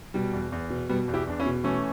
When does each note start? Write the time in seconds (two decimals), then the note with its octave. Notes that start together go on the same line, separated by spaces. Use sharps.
0.14 B2 G3
0.33 E2
0.52 E2
0.70 B2
0.89 B2 G3 B3
1.08 E2
1.14 E4 G4
1.27 E2 D4
1.40 C#4 E4
1.46 B2
1.64 E3 A3 C#4